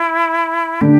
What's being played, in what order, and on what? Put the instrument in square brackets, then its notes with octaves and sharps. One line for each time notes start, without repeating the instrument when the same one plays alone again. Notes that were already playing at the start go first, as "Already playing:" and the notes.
Already playing: [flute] E4
[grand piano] D3 A3 D4 [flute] G4